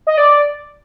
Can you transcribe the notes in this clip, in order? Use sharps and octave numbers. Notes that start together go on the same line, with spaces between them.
D#5
D5